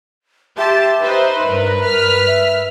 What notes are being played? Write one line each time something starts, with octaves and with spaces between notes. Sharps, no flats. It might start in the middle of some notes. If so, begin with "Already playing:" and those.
G4 E5 A5 C6
D#4 B4 C5
G2 A#4
G2 A#4 F6 B6
E5